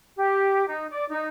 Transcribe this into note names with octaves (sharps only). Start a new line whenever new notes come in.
G4
D#4
D5
D#4